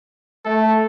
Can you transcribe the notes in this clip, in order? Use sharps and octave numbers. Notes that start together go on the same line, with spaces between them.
A3 A4